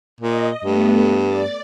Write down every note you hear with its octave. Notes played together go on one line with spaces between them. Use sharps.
A#2 D#5
G2 A3 B3
D5 A6